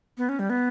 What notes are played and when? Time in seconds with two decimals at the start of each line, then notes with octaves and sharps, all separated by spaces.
0.18 B3
0.29 C#4
0.39 G3
0.50 B3